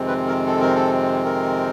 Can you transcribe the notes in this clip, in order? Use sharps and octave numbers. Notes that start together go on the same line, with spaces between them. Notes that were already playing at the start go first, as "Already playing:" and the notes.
Already playing: F2 C3 D#3 G#3 C4
B4
A#4
A4
A#4
A4
A#4